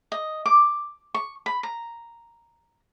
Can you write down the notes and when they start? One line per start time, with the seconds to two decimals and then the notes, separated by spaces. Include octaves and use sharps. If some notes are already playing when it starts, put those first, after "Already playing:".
0.12 D#5
0.46 D6
1.14 C#6
1.46 B5
1.63 A#5